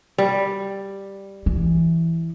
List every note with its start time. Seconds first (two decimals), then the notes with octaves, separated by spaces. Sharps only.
0.18 G3
1.46 E3